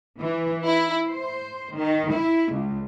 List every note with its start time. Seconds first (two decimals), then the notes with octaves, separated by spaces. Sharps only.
0.19 E3
0.65 E4
1.07 C5
1.76 D#3
2.13 E4
2.53 C#2